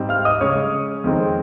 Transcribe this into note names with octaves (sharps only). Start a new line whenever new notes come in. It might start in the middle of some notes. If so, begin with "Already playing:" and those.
Already playing: G#2 G3 C4 D#4
F5 F6
D#5 D#6
C#3 G#3 C#4 C#5 C#6
F2 D#3 G#3 C4 D#4